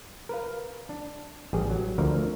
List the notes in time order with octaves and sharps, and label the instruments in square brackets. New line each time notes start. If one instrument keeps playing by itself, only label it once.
[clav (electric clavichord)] A#4 B4 F5
D4
A1 G3 G#4
F#3
D2 D3 F3 A#4 C#5